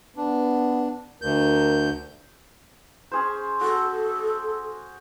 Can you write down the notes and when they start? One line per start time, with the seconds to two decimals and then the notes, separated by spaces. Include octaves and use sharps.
0.17 B3 D4
1.22 D2 A#4 G6
3.12 C#4 G#4 C5
3.61 F#4 A4